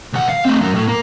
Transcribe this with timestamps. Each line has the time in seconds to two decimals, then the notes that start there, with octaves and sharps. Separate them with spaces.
0.13 D2 F#5
0.29 F5
0.45 A3 C4
0.61 F#2 F#3
0.75 A2
0.88 A#3